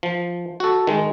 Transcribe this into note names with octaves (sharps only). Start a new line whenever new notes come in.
F3
F#4 A4
D#3 G#3